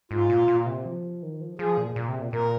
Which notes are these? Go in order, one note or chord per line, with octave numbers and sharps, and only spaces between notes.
G#2 F4
A#2
A#2
C3
F3
D#3
F3
F3 G#4
A#2
A#2
C3
A#2
A#2 A#4